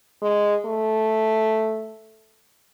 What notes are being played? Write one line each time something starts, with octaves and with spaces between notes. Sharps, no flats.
G#3
A3